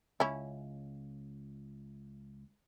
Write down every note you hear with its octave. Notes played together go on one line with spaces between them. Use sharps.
C#2 C#4 E4